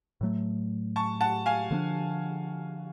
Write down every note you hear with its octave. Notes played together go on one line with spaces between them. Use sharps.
A2 F#3 A3
A5 C#6
F#5 A5
F5 G#5
D3 F3 A3 D4